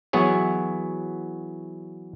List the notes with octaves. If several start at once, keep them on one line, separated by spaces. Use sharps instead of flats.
E3 F#3 B3 E4 G#4 C#5